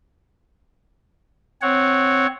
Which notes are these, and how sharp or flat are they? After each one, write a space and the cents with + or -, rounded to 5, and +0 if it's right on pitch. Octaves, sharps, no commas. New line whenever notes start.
C4 +0 C#5 +0 F#5 -5